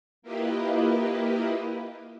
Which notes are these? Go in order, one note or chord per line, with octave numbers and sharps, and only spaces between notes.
A#3 E4 F4 G4 B4 D#5